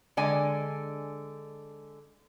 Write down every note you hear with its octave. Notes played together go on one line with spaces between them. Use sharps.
D3 G#3 D5 G#5